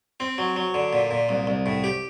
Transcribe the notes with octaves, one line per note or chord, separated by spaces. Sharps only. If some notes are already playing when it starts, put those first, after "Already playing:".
C4
F#3
F#3
D3
A#2
A#2
C2
C2
A2
G4